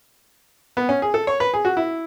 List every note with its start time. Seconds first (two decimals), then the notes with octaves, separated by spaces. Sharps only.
0.77 B3
0.89 C#4
1.02 G#4
1.14 A4
1.27 C#5
1.40 B4
1.54 G#4
1.65 F#4
1.77 E4